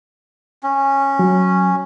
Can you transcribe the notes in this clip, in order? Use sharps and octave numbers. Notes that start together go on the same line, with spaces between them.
C#4
F#3